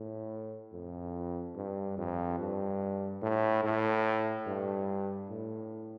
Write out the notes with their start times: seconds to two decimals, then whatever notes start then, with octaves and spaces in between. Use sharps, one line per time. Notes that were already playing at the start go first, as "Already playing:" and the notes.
Already playing: A2
0.73 F2
1.56 G2
1.98 F2
2.39 G2
3.22 A2
3.63 A2
4.47 G2
5.30 A2